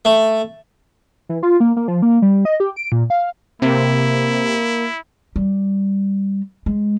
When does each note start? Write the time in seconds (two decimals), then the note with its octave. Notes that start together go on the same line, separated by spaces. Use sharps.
0.05 A3
1.29 E3
1.43 F4
1.60 A#3
1.76 A#3
1.88 F3
2.02 A#3
2.22 G3
2.45 D#5
2.60 G4
2.76 D7
2.92 A#2
3.10 F5
3.62 C3 A#3 E4
5.36 G3
6.66 G#3